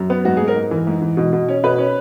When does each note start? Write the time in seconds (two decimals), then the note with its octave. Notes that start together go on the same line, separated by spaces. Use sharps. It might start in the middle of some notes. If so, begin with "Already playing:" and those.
Already playing: F#2
0.10 B3
0.25 G#2 F#4
0.37 G#2 G#4
0.48 A#4
0.56 G#2
0.71 E3
0.87 G#2
1.02 E3
1.17 B2
1.33 B2
1.49 C#4
1.63 B2 B4
1.78 C#4